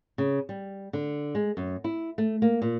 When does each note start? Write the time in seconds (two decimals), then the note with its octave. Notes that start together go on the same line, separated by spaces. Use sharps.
0.18 C#3
0.49 G3
0.93 D3
1.35 G#3
1.57 F#2
1.84 E4
2.18 A3
2.42 A#3
2.62 A#2